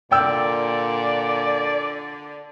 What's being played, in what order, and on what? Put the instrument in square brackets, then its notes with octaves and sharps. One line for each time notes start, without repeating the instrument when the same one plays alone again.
[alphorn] A#2 [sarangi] D3 [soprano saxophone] D5 [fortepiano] G5 E6